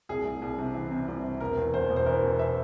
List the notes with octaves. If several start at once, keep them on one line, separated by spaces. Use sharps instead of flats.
C2 G#4
C2
C2
C3
E3
C3
C2
C3
E1 A#4
E2
E2 C5
E1
C5
E3 A#4
E2
E5